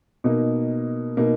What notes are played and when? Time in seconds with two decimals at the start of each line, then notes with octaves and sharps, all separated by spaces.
0.24 B2 A#3 D#4
1.17 B2 A#3 D#4